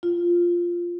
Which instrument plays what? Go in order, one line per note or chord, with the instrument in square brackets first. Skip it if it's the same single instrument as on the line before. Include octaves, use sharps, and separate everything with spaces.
[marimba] F4